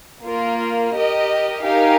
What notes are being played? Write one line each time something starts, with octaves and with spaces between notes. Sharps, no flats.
A#3 F4 A#4
G4 A#4 D#5
D#4 G4 A#4 F5 G#5